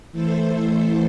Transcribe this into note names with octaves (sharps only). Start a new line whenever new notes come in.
E3 A3 E4 A4 C5